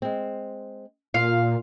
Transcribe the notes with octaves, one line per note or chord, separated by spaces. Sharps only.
G#3 C4
A#2 F4 F5